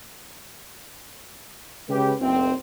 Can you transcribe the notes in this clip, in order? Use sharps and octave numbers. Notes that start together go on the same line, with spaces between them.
C#3 G#3 G4 B4
F#1 B1 C4